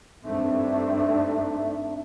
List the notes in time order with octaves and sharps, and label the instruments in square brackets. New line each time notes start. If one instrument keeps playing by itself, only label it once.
[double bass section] G2 A3 C4 [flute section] D4 D#4 E5